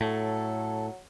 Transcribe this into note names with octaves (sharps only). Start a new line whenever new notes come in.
A2 F#3 A4